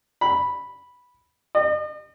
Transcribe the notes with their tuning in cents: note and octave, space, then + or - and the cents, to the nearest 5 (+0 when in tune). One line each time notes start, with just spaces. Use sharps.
B5 -5
D#5 -40